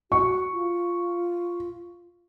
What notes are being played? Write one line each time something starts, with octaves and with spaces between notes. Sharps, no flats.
F#4 C#6
F4